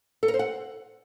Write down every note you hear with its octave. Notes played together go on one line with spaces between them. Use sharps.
A4
A#4
C5
F#5